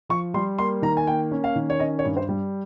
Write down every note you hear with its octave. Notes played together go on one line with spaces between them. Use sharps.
F3 C#6
G3 C6
A#3 C6
D#3 A#5
G#5
A#3 G5
C#4
F5
D#3
C#5
C#4 D#5
C#5
G2
C5
G3